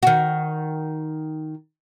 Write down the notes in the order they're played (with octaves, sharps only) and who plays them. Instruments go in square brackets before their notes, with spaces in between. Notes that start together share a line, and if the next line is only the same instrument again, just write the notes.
[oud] D#3 F#4